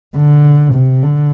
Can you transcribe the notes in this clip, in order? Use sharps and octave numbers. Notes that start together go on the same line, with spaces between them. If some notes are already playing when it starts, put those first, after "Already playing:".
D3
C3
D3